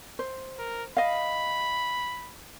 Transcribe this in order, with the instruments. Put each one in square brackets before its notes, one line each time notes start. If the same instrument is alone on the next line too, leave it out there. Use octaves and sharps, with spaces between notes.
[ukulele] C5
[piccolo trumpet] A#4
[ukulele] D#5 F5 [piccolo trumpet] B5